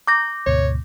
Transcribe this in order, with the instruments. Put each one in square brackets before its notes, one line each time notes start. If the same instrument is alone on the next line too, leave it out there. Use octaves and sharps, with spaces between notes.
[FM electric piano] A#5 [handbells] D6 G6 A#6
[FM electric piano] D2 G#2 B2 [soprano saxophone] C#5